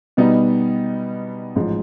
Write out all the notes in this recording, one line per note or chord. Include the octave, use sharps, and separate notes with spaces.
B2 G3 B3 D#4
A1 G#2 F3 G#3